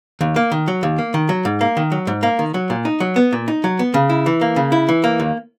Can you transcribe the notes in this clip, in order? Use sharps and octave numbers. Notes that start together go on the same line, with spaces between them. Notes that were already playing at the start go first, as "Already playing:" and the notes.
D#2
A#3
D#3
F#3
D#2
A#3
D#3
F#3
G#2
A#3
D#3
F#3
G#2
A#3
D#3
F#3
A#2
D#4
F#3
B3
A#2
D#4
F#3
B3
C#3
E4
E3
A#3
C#3
E4
E3
A#3
D#2